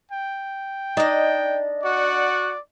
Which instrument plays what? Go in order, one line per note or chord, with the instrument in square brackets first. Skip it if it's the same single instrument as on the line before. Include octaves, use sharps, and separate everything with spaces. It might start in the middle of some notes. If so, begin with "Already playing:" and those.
[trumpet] G5
[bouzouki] D4 D#5 [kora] D#4
[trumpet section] F#4 F#5 [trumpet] D5